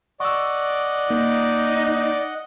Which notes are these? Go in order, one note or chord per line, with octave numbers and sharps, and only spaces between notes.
D5 D#5 F#5 C#6 E6
A#3 D#4